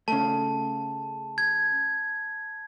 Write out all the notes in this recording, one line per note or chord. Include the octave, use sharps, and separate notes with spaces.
C#3 A3 A5
G#6